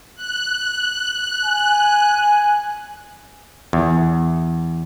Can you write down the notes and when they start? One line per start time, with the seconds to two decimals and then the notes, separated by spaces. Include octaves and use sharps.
0.15 F#6
1.45 G#5
3.73 E2